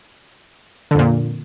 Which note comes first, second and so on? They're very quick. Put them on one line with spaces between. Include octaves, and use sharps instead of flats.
D3 F2 A#2